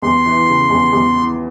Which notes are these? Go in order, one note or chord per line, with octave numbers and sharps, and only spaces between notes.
E2 C6
E3
C#3
E2
E2
E3